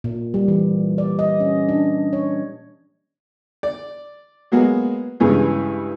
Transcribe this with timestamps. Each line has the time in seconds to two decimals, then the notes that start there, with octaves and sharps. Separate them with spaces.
0.04 A#2
0.34 G3
0.48 E3
0.98 D5
1.19 D#5
1.40 C#4
1.69 D4
2.13 C#5
3.63 D5
4.52 F#3 G#3 A#3 B3 F#4
5.20 G2 C#3 E3 G#3